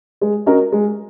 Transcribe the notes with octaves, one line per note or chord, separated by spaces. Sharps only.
G#3
C#4 F#4 A#4 D#5
G#3